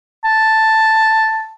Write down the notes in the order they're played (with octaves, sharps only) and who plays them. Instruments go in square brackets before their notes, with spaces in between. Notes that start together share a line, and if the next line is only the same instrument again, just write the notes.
[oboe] A5